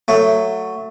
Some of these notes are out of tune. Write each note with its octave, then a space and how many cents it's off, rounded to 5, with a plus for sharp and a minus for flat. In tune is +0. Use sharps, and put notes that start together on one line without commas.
F#3 +0 A3 +15